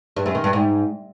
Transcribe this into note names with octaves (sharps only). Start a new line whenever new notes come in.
G2
F#2
D#3
G2
G#2